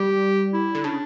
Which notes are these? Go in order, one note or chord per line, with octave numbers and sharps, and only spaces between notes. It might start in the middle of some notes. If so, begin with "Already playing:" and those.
Already playing: G3 G4
E4
D3
C#3 D4